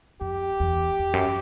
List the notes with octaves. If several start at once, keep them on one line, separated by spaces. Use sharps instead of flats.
F2 G4
E2
E2
F#2